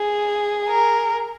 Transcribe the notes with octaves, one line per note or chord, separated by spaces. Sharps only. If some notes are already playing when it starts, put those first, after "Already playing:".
Already playing: G#4
A#4